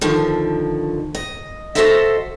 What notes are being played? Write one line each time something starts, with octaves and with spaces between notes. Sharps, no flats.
D3 D#3 F3
D#5
F#4 G4 A4 C5 D#5 E5